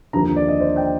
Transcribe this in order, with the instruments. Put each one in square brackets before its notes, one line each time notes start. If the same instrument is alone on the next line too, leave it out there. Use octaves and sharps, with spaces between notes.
[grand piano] D#2 D3 F3 A#5
D5
D#5
C5
G5